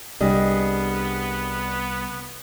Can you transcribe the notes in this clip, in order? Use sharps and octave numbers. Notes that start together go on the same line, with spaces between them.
C2 G3 B3 D4 G#4 D#5